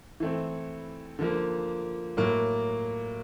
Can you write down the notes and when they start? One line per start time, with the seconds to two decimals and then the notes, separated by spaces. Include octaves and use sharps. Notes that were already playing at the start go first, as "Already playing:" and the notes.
0.20 E3 A3 C4
1.19 D3 F3 A#3
2.17 A2 F#3 A#3